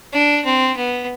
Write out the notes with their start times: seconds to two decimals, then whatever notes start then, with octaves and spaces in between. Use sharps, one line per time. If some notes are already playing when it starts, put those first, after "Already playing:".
0.13 D4
0.45 C4
0.77 B3